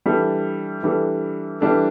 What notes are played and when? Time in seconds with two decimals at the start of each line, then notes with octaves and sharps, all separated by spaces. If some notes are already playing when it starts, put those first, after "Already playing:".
0.06 E3 G3 D4 A4
0.83 E3 G3 D4 A4
1.61 E3 G3 D4 A4